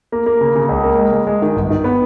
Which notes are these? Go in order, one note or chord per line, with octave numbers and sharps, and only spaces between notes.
A#3
A#3
C#3
C#3
C#2
A#3
G#3
G#3
G#3
D#3
G1
D#3
B3